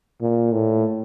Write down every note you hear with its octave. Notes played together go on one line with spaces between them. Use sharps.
A#2
A2